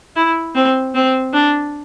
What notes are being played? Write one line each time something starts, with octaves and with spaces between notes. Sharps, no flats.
E4
C4
C4
D4